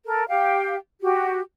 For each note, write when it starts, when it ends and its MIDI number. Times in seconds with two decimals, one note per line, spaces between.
0.05 0.24 69
0.05 0.24 70
0.28 0.76 67
0.28 0.76 77
0.28 0.76 79
1.01 1.40 66
1.01 1.40 67